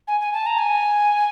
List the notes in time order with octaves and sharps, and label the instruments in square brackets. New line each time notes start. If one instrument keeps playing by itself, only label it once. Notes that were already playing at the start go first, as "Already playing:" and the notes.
[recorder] G#5
G#5
A5
A#5
G#5